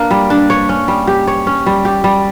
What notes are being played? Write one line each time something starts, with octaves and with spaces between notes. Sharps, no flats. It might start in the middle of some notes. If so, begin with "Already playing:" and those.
Already playing: A#3 D4
G3
D4
C#5
C#4
G3
G4
C#5
C#4
G3
G4
G3